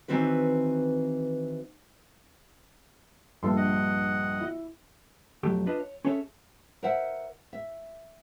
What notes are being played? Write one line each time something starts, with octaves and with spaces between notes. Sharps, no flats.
D#3 E3 C4 F#4 B4
A#1 G2 A4 C6
D#5 F#5
E4
B1 F2 F#3 A3 G4
D4 F4 B4 D#5
C#5
C#4 G#4 A4 C#5 E5
A#4 C5 E5 F#5
E5